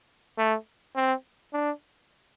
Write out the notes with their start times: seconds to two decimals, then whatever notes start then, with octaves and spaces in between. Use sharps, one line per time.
0.38 A3
0.96 C4
1.53 D4